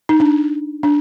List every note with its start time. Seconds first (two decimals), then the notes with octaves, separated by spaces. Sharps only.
0.09 D#4
0.20 D4
0.83 D4